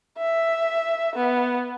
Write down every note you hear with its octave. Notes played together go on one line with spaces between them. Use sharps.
E5
B3